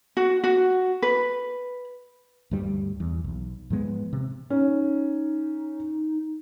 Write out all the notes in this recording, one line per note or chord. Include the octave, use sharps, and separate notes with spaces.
F#4
F#4
B4
D2 G2 G3
E2
B1
G#2 F3 G#3 B3
C3
C#4 D#4